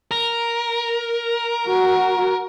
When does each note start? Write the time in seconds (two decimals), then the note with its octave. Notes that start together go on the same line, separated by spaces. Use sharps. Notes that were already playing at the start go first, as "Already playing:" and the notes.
0.11 A#4
1.69 F#4